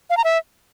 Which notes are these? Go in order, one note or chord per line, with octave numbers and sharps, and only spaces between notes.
F5
A#5
E5